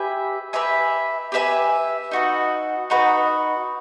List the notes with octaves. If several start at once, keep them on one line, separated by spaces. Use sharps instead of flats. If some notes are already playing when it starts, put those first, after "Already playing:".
Already playing: G4 B4 E5 G#5
G4 B4 E5 G#5
G4 B4 E5 G#5
D#4 F#4 B4
D#4 F#4 B4